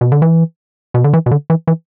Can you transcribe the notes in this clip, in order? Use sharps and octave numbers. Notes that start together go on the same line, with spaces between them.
B2
D3
E3
B2
D3
E3
B2
D3
E3
E3